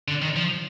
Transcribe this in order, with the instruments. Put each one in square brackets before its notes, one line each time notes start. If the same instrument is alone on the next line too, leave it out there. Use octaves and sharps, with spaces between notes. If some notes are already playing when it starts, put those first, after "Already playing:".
[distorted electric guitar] D3
D#3
F3